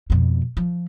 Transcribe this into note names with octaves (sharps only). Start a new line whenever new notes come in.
F2 B2
F3